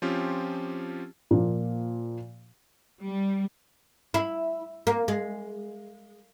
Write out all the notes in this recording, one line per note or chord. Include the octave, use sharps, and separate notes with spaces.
F3 C4 C#4 F4 G4
A#2 F3 A#3
G3
E4
A#3
G#3